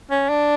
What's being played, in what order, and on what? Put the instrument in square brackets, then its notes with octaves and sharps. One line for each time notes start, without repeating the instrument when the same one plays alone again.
[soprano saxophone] C#4
D4